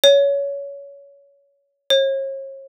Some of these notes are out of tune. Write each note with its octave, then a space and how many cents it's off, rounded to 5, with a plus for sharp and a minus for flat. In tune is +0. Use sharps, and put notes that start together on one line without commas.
C#5 +20
C#5 -40